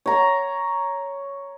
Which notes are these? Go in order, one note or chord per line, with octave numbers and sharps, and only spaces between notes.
C#5 A#5